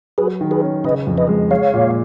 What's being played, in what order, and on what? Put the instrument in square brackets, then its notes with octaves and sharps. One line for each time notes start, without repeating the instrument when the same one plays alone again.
[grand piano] F#3 [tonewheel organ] G#4 B4
[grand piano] D#3
[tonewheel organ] G#4 B4
[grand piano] C#4
[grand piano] C#3 [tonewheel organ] B4 D#5
[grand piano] F2
[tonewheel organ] B4 D#5
[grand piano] G#3
[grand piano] G#3 [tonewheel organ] C#5 F5
[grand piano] A#2